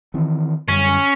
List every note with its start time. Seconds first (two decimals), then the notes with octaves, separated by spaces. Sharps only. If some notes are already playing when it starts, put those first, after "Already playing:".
0.14 D#3 E3 C4
0.69 F#2 D3 G3 C#4